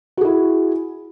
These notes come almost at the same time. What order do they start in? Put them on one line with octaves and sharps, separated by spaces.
F#4 G#4 E4